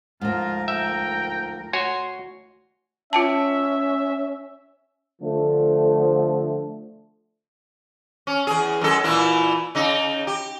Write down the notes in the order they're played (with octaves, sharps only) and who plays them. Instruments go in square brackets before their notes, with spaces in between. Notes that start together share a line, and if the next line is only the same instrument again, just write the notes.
[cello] D2 A#4 [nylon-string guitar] G#2 F3 [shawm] F4
[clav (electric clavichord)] E5 [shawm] G5
[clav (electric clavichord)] F#4 C#5 G#5 [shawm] C6
[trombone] C#4 [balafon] F4 G5 A5 [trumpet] E5
[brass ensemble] D3 F3 A3
[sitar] C#4
E2 G#4
F#2 G#3 A4
A#2 E3 E4
C#3 D#4
G4